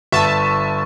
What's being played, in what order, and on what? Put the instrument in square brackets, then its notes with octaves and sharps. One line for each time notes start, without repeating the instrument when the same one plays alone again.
[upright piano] G1 [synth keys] E5 A5 [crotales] C#6